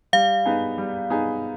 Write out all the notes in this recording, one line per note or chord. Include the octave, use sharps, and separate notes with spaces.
G3 F5
B3 D#4 G#4
G3
B3 D#4 G#4